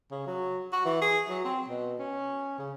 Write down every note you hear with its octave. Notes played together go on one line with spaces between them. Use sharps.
C#3
F#3
F#4
E3
G#4
F#3
C4
B2
C#4
C#3